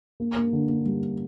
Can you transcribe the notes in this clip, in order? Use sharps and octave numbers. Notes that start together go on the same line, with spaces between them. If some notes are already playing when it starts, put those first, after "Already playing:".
A#3
A#3
D3
A#3
G3